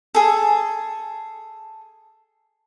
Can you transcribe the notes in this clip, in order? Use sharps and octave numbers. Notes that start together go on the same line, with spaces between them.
G#4 A4